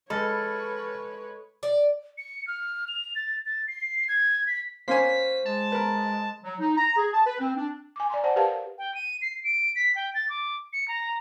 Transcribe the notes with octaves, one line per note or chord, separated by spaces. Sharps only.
G#3 A4 B4 C#5 B5 F6 A6
D5
C#7
F6
F7
A6
A6
C7
G#6
B6
A#3 C#4 C5 G#5 B6
G#3 A5
A#4 B4
F#3
D#4
A#5
G#4
A5
B4
C4
D4
G#5 D6
D5 G#5 A#5 C6
C5 D5 F#5 A5
G4 A#4 B4 F5 A5
G5
D#7
C7
D7
B6
G5
A6
D6
C#7
A#5